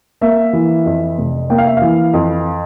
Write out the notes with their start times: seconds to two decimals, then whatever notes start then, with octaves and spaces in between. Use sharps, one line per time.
0.21 A#3 E5
0.53 E3
0.86 F2
1.18 F1
1.50 A#3 G5
1.58 F5
1.67 E5
1.77 E3 F5
2.14 F2